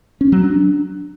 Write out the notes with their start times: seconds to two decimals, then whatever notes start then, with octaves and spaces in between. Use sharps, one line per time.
0.21 C#4
0.32 F#3
0.44 D4